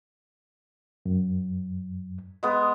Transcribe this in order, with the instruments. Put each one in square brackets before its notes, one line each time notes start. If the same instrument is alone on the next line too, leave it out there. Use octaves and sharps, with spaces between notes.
[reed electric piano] F#2
[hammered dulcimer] G#3 B3